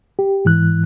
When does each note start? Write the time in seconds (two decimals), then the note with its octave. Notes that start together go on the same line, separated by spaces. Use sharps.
0.19 G4
0.45 G#2 E3 F#6